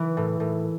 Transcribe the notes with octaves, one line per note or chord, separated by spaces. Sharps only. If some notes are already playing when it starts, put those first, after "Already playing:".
Already playing: E3 E4
A2
A2